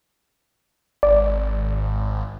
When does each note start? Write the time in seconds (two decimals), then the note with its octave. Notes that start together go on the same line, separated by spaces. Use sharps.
1.03 G#1 D5